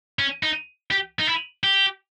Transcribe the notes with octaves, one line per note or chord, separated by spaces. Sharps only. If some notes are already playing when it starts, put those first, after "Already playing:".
C#4
D#4
G4
D#4
E4
G4